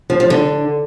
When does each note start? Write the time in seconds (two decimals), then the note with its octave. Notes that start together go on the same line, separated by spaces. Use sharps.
0.10 F3
0.20 F3
0.30 D3